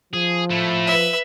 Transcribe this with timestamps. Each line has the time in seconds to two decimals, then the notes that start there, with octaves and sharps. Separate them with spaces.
0.13 F3 G#4
0.50 A3 E4
0.87 B4 E5